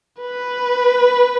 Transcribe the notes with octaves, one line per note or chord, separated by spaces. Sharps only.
B4